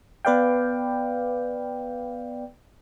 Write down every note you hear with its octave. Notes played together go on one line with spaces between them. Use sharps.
B3 B4 D5 F5 G5